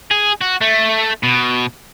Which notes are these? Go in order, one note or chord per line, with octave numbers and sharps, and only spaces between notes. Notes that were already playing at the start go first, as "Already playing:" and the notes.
G#4
F#4
A3
B2